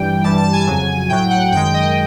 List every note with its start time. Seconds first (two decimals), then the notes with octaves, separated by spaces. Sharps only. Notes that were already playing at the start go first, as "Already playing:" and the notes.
Already playing: G2 E3 G3 G5
0.24 G2 E3 G3 A5
0.38 A5
0.53 G#5
0.67 F2 C#3 F#3
1.09 A2 F#3 G5
1.30 F#5
1.52 F#2 D#3 G#3 G5
1.74 D#5